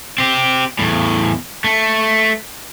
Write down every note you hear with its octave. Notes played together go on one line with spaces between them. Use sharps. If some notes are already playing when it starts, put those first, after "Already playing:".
C4 G4
E2 A2
A3